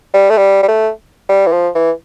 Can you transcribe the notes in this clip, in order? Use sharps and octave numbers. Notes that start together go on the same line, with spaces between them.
G3
A3
G3
G3
A3
G3
E3
F3
E3